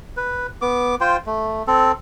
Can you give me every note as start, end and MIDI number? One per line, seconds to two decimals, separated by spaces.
0.17 0.47 71
0.62 0.95 59
0.62 0.95 86
1.01 1.17 65
1.01 1.17 72
1.01 1.17 79
1.27 1.63 57
1.67 1.92 60
1.67 1.92 69